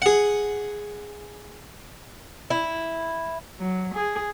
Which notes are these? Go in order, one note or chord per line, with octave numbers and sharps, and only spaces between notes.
G#4 F#5
E4
F#3
G#4